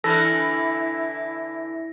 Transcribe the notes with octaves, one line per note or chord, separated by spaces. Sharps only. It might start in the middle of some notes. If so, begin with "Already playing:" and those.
D3 E3 E4 A4 B5 F6 A#6